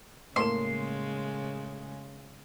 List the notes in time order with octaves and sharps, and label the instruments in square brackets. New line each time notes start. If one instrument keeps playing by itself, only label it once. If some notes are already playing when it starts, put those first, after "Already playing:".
[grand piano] A2 A#3 E7 [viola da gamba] C#3 G#3 [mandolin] C6